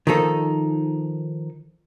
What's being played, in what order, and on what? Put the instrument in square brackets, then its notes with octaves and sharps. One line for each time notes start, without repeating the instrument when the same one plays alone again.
[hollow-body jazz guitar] D#3 F3 D#4 A4